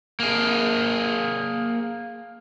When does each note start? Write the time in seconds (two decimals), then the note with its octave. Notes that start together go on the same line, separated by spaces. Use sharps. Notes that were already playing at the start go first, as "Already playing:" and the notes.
0.20 A#3 G#4